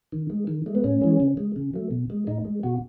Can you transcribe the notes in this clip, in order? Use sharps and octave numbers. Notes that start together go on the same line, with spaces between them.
D#3
G#3
D#3
G#3 A3
B3
A2 C#4
E3 G#3
C#3
G#3
C#3
F#3 A3
B2
G#3
A2 D#4
G#3
B2 F#4